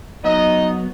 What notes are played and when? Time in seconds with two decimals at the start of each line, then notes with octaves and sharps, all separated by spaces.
0.24 F#3 B3 D#4 D#5